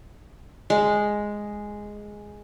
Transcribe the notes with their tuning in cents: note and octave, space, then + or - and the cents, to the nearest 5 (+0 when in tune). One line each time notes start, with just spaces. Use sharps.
G#3 +0